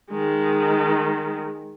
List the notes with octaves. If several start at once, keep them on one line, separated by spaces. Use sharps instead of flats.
D#3 G#3